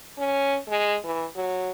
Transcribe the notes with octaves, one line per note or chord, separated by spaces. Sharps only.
C#4
G#3
E3
F#3